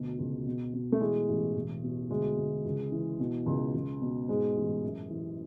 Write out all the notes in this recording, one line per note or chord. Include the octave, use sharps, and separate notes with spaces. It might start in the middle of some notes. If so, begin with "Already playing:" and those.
Already playing: D2 B2
C#2
B2
B2
A3
E3 G#3
A1
E1
B2
D2 G#3
D2
C#2
E3
B2
C#2
C#2
B2
G#2 G#3
A1
F#2
E3